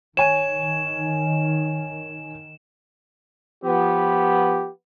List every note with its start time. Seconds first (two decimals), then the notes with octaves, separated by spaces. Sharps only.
0.17 D#3 C#5 G#5 D#7 E7
3.64 F3 B3 G4